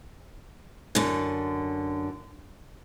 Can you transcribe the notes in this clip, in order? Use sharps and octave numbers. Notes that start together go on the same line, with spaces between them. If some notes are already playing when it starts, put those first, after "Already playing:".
F#2 D3